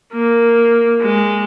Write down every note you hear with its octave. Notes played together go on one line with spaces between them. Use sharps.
A#3
G#3